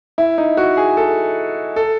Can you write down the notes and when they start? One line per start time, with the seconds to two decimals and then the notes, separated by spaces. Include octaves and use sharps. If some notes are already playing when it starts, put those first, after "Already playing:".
0.18 E4
0.38 D#4
0.57 F#4
0.77 G#4
0.97 A4
1.76 A4